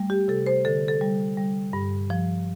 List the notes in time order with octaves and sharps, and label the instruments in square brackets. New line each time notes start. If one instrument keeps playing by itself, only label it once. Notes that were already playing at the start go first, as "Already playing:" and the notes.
Already playing: [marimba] G3 A3
G4
C3 A4
C5
D3 A4
A4
G3
G3
G2
F3